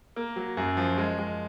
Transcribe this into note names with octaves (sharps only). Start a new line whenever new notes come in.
A#3
F#3
F#2
F3
G#3
G#3